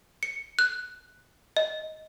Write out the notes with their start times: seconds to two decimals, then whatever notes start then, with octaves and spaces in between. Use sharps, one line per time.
0.23 C#7
0.59 F#6
1.57 D#5